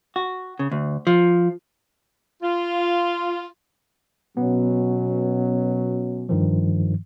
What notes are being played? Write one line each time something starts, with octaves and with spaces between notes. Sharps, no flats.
F#4
C#3
D2
F3
F4
B2 F#3 B3 C#4
G2 D#3 F3